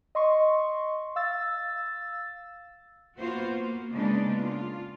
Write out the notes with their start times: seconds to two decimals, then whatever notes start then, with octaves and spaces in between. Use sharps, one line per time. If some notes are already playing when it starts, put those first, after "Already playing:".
0.15 D#5 C6 C#6
1.16 F5 E6 A6
3.18 A#3 B3 F4 F#4 C5
3.51 A#3
3.92 C#3 G#3 A#3 B3 D4 D#4
4.33 F4